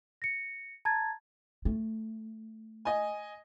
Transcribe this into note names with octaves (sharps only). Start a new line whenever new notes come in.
A#6 C#7
A5 A#5 G#6 A6
A3
D#5 G#5